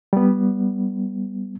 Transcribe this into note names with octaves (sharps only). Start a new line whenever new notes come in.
G3 B3